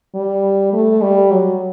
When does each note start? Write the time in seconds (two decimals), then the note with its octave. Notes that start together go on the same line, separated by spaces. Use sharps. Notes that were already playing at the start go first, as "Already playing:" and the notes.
0.14 G3
0.73 A3
1.02 G3
1.31 F#3